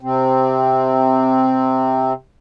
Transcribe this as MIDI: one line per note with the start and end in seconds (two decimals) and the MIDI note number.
0.01 2.13 48
0.01 2.13 60